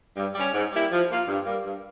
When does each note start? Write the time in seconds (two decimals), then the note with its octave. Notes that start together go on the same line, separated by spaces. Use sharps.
0.17 G2
0.35 G3 C#4
0.54 G#2
0.73 G3 A#3 E4 G4
0.91 F3
1.10 A#3 F4
1.28 G2
1.46 G3 A#3
1.65 G2